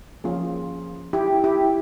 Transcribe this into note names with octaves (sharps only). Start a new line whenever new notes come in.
F3 A#3 C#4 F4 G#4
E4 G4
E4 G4